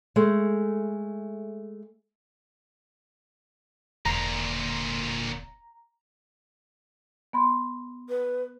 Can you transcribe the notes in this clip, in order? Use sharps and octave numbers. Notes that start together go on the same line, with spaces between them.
G#3 A3
E1 D2 A#2 A#5
B3 B5 C6
B4